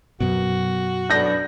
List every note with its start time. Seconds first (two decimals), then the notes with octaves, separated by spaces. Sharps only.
0.20 F#2 B2 F#4
1.10 F#3 B3 D4 G6 A#6